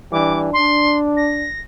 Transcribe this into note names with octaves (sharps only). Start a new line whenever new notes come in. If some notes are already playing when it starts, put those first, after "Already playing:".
E3 G3 D4 D6
D4 C6
A#6